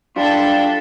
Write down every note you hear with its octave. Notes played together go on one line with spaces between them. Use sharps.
G3 D4 F4 A4